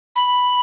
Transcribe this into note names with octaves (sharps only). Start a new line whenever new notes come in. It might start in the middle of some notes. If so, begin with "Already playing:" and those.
B5